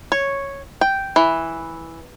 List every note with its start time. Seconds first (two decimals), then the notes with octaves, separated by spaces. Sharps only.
0.12 C#5
0.81 G5
1.16 E3